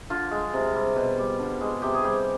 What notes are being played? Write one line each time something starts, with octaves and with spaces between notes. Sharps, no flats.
D3 F4
G#3
C3
G3
B2
G3
D3
G#3
C3 G4
G#4
G3 G4